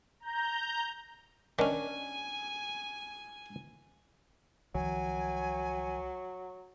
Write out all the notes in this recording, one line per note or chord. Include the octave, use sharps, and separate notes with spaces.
A#5 G6
D#3 C#4 D4 G#5
C2 D#3 F3 F#3 G#5